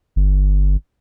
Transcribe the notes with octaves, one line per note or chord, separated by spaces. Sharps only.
G1